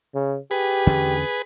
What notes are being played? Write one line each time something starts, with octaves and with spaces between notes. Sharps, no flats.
C#3
G4 G#4 B4
E2 D3 C#4